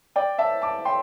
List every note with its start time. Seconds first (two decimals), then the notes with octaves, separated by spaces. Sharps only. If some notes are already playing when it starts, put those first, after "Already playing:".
0.16 D5 G5
0.38 E5 A5
0.62 A5 D6
0.85 G5 C6